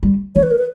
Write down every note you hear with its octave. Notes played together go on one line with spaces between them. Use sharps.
G3
E3 C#5
B4
A#4
B4